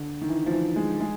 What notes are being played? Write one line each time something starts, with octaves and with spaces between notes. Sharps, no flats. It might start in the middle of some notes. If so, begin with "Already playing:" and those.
Already playing: D3
D#3
E3
F3
E3
G#3
G#3